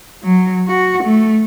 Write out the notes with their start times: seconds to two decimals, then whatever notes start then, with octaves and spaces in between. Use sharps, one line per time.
0.23 F#3
0.68 F#4
1.04 A3